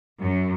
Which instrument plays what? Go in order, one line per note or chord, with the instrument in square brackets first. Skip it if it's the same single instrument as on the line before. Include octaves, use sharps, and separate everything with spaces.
[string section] F#2